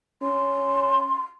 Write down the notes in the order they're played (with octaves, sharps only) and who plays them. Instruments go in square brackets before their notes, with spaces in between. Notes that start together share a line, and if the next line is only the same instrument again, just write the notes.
[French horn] C#4 [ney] C6